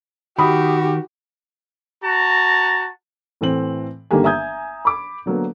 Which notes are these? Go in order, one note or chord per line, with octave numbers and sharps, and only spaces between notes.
D#3 F#4 G4 B5 D#6
F#4 A5 A#5
A2 E3 C4 F#7
G1 D3 D#3 A#3 G4 G#5
E5 G#5 A#5 D#6 G6 G#6
B5 D6
D3 F#3 A#3 B3